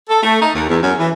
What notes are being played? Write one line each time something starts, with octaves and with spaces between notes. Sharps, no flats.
A4
A3
D#4
D#2
E2
F#2
E3